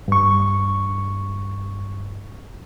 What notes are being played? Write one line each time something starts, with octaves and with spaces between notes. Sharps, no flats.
G2 C#6